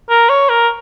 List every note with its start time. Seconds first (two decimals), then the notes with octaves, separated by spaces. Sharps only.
0.10 A#4
0.29 C#5
0.50 A#4